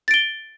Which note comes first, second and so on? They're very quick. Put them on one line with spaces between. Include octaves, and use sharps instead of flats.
A6 D7 G7